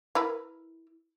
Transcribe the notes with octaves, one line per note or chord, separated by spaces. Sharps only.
E4 A#4 B4